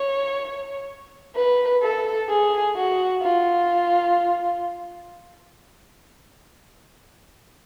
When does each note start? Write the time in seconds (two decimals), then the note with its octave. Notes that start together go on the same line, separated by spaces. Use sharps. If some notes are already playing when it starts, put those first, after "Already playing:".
Already playing: C#5
1.36 B4
1.83 A4
2.29 G#4
2.76 F#4
3.22 F4